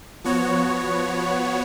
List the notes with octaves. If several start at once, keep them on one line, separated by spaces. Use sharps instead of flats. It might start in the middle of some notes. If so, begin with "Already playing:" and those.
F3 B3 F#4 C#5